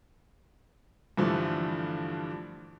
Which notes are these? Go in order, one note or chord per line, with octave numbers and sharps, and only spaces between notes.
G2 D3 E3 F3 A3